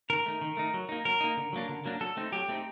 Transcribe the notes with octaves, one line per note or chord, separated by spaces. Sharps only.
D#3 A#4
A3 D#4
D#3
A3 D#4
F#3
A#3 D#4
F#3 A#4
A#3 D#4
D3
F#3 A#3 D4
D3
F#3 A#3 D4
F#3 A4
A3 C4 D#4
F#3 G4
A3 C4 D#4